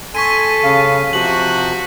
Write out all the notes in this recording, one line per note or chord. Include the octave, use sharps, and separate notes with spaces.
A4 G#5 C6 C#6 B6 D#7
C#3 F5
C3 F3 F#4 F#7